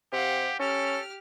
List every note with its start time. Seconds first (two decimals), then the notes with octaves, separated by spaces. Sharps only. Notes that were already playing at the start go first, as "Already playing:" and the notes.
0.13 C3 G4 F5 F#5
0.60 C#4 G4 A4 F6